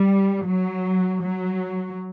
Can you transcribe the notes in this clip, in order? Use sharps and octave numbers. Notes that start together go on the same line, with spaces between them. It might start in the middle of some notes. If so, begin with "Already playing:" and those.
Already playing: G3
F#3
F#3